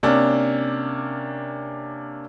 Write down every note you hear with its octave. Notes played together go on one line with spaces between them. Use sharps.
C3 A#3 C#4 D4